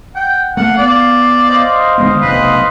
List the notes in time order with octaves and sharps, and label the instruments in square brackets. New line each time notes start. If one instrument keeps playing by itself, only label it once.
[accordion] F#5 [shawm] G5
[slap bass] A3 A#3 [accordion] F5 [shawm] F#5
[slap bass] B3 [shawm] D5
[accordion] C5 D#5 F5
[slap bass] D3 G#3 B3
[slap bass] F1 B1 [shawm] B4